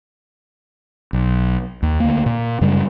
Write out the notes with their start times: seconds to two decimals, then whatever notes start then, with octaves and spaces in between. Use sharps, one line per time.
1.13 B1
1.82 D#2
2.00 D2 A#3
2.26 A#2
2.61 F#2 C#3 G3 G#3